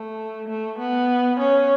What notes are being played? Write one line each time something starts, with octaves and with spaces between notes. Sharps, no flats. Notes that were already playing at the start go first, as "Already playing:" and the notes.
Already playing: A3
A3
B3
C#4